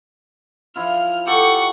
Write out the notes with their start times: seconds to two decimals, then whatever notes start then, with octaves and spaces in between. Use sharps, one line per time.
0.76 F3 E4 F4 F6
1.26 G4 A4 F#5 C#6 D6